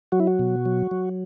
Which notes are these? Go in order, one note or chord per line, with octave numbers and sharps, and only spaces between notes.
F#3 F#4
E4
F#4
B2
F#3
F#3